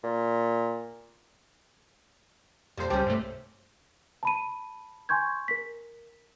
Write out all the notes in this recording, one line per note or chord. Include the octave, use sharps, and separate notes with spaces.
A#2
F2 A#2 G3 A4 C5
C#2 G3 C4 C#4 G4
G2 C3 A3
A5 B5 D#7
G#5 C6 C#6 G6 G#6
A#4 B6